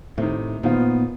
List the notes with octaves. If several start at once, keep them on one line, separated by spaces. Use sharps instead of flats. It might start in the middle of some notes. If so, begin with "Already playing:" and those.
A2 C3 D#3
A#2 D#3 F3 B3 F4